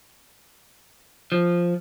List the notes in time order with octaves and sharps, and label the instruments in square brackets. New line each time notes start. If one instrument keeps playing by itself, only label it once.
[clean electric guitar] F3